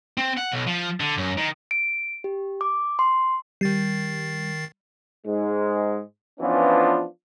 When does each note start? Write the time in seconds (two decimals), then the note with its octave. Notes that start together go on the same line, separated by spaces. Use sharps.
0.18 C4
0.38 F#5
0.52 B1
0.67 F3
1.00 D3
1.18 F#2
1.38 D#3
1.71 D7
2.24 G4
2.61 D6
2.99 C6
3.61 D#3 G3 A6 C7
5.26 G#2 G#3
6.40 E3 F3 B3 C#4 D4 F4